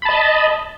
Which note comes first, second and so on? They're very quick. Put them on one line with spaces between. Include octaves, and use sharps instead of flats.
B5 A5 D#5